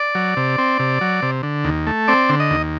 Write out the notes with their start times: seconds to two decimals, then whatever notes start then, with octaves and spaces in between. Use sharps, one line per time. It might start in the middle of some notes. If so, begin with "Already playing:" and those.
Already playing: D5
0.15 F#3
0.37 C3
0.58 C4
0.79 C3
1.01 F#3
1.22 C3
1.43 D3
1.64 D#2
1.87 A3
2.08 C4 D5
2.29 D3
2.40 D#5
2.51 D#2